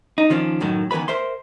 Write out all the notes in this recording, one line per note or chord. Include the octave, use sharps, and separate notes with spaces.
D#4
D#3 F3 C#4 D4
F#2 A2 D#3 F#3
D#3 E3 B3 B4 B5
A#4 C5 E5 C6